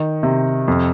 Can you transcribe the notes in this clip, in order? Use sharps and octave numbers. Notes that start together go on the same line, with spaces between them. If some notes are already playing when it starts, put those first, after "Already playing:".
Already playing: D#3
C3
F2